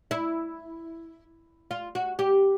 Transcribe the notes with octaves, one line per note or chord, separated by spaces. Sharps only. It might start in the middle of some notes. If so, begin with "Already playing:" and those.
E4
F4
F#4
G4